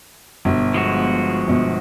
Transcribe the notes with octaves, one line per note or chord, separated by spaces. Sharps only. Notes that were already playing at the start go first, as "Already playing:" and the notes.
G1 B2
F3 G#3 F#4
G1 B2